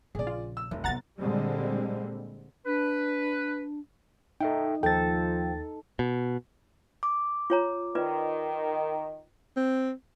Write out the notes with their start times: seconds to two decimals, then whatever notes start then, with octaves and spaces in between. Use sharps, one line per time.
0.15 A#1 C#3 G#4 D5
0.27 F4
0.57 E6
0.71 F1 D2 C3
0.84 F#2 B3 F#5 A#5 A6
1.21 A#2 D3 G3 G#3 C4
2.66 D4 B4
4.41 D#4 A4 E5 G5
4.83 D#2 F3 A4 G5 A6
5.99 B2
7.03 D6
7.50 F4 C#5 A#5
7.95 D#3 F4 B4 D5
9.57 C4